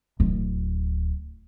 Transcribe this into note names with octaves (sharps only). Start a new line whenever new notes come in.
D1